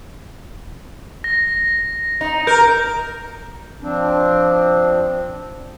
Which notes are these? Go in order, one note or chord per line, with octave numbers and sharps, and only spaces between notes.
A#6
D#4
A#4 G6
F3 C4 D4